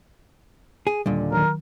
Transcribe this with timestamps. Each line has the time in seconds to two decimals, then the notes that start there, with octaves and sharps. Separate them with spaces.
0.87 G#4
1.06 D#2 A#2 D3 G3
1.32 D#3 F#3 A#4